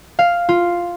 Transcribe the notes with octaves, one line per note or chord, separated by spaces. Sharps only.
F5
F4